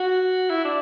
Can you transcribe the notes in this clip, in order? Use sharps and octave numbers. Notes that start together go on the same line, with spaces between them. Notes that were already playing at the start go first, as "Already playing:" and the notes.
Already playing: F#4
E4
D4